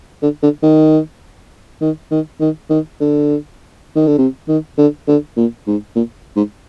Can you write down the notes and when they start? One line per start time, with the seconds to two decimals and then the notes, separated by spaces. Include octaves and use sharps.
0.23 D3
0.43 D3
0.63 D#3
1.81 D#3
2.11 D#3
2.40 D#3
2.70 D#3
3.00 D3
3.96 D#3
4.07 D3
4.18 C3
4.48 D#3
4.78 D3
5.08 D3
5.37 A#2
5.67 G#2
5.96 A#2
6.36 G#2